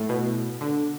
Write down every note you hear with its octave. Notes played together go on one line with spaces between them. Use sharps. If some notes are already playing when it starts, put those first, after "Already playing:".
Already playing: A2
B2
D3